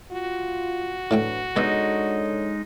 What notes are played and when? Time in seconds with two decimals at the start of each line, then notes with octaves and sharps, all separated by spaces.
0.12 F4 F#4
1.11 A2 E3 F#3 A3 D4 G5
1.56 B2 G#3 D4 D#4 A4 C#5 D5 E5